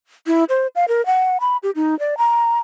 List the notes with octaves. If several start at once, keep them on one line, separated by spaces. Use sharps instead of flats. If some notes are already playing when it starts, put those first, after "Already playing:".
E4
C5
F5
A#4
F#5
B5
G4
D#4
D5
A#5